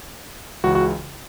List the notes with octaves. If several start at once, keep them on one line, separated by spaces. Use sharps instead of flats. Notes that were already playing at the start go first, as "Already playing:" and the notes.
C#2 C#3 E3 F#4
F#4